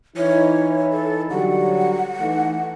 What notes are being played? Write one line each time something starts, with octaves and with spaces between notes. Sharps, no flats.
E3 D#4 E4 C#5
A4
D3 F#3 G3 F#5
E3 A3 D#4